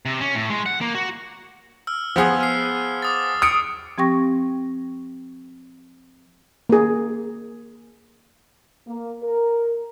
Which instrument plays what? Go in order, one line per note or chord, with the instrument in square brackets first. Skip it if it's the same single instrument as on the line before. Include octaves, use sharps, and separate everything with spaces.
[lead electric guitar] C3
C#4
A2
G#3
F#5
A#3
F#4
[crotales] E6 F6
[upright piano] F3 B3 G#4
[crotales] F6 C7
D6 D#6 A6
[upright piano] D#6 C#7 D7
[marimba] F3 C4 G4 G5 C#6 A#6
[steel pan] A#3 G#4
[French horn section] A#3
A#4